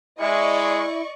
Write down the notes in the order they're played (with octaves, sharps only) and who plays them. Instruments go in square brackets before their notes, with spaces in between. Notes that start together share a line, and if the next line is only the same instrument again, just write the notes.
[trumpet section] G#3 [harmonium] E4 [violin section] D5 D#5 C#6